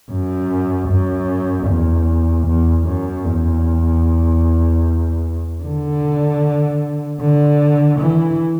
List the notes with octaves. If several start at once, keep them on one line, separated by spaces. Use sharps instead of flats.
F#2
F#2
E2
E2
F#2
E2
D3
D3
E3